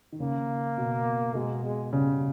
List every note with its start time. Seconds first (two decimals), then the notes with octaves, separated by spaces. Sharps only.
0.12 D#3
0.20 C#3 A#3
0.78 B2
1.35 B2 G#3
1.64 G#3
1.93 C#3 G3